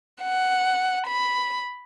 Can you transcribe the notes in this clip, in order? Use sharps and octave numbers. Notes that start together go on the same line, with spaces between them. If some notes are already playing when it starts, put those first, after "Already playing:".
F#5
B5